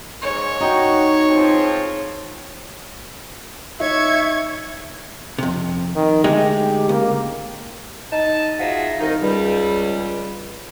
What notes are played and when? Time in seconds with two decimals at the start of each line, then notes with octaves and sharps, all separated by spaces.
0.22 G#2 C#5
0.61 D#4 F#4 G5
1.28 F3 G#3 C4
3.80 D#4 C#5 E5 C#6 G#6
5.38 F2 C3
5.96 D#3
6.24 D2 G#3 D#4 G4
6.89 C#2 A#3
8.11 D#4 A5
8.59 D#4 F4 F#4 G#4 D#5 E5
9.00 C2 D#3 D#4
9.21 C#2 G3